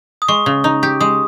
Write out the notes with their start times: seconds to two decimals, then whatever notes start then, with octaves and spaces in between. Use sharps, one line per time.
0.22 D#6
0.28 G#3 C#6
0.46 C#3
0.64 D#4
0.83 G4
1.00 G#3 D#6